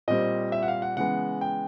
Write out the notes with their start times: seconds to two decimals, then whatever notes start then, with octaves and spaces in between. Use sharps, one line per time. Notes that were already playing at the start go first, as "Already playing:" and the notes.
0.08 A#2 G3 C4 D#5
0.52 E5
0.63 F#5
0.68 F5
0.82 F#5
0.97 C#3 E3 G#3 B3 F#5
1.41 G5